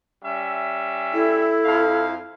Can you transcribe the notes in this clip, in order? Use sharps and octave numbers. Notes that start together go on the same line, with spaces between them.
G3 C#4 E5
E4 A4
F2 F5